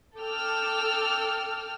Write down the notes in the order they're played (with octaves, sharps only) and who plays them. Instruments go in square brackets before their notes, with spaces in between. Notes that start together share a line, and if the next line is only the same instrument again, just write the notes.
[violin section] A4 G5 D6 E6 F6